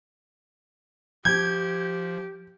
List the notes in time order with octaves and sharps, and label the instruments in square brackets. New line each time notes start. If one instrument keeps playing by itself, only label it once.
[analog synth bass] F3 [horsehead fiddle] G4 [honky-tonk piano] G6 [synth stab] G#6